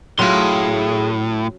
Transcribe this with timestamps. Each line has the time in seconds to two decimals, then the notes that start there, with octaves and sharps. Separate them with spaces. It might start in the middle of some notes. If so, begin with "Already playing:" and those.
0.19 A2 F#3 C#4 F4 G#4 C6